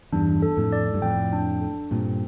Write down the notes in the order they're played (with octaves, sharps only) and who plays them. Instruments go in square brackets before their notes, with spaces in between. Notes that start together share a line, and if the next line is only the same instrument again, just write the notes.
[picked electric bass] E2 G2 [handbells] D4
[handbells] A4
[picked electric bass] F2 A2
[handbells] D5
[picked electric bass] G2
[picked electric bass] F2 A2 [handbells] G5
[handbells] D4
A4
[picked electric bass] G2 A#2 [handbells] C4